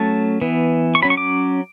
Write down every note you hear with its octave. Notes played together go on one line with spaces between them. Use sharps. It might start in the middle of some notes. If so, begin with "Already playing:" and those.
Already playing: F#3 A3 C#4 A5
E3 B3
C#6
F#3 C#4 B5
C#6
D6